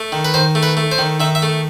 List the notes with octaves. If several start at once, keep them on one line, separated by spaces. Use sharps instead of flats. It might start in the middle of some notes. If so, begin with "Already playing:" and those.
Already playing: A3
D#3
B4
D#3 C5
A3
B4
A3
C5
D#3
D#3 E5
E5
A3